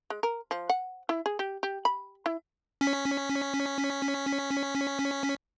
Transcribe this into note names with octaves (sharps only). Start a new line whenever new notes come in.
G#3
A#4
F3
F#5
E4
G#4
G4
G4
B5
E4
C#4 B6